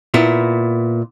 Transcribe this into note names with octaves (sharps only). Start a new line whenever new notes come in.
A#2 B3 E4